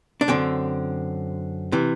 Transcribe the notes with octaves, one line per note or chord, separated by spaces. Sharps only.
D4
F#2 D3 C4
C3 E3